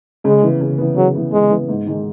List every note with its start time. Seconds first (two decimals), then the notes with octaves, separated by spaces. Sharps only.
0.25 C#3 G#3
0.43 E3 B3
0.61 C#3
0.78 E3 B3
0.96 C#3 F#3
1.15 E3 B3
1.33 C#3 G#3
1.51 E3 B3
1.69 G#2
1.86 D#3 G#3 D#4